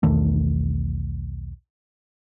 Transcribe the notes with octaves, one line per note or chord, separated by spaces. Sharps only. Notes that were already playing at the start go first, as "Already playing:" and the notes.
B1 E2 D#3 A3